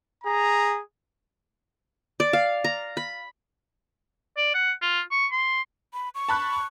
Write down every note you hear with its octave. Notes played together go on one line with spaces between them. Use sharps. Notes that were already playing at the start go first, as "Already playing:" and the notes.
G#4 A#5
D5
F5
A#5
B5
D5
F#5
F4
C#6
C6
B5
C#6
A5 B5 F#6